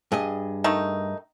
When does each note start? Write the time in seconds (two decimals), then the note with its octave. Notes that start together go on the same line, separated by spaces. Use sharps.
0.12 G2 G#4 D#5
0.64 D#3 A3 D#4